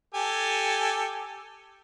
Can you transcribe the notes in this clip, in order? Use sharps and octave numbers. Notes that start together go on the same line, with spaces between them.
G4 A4 G#5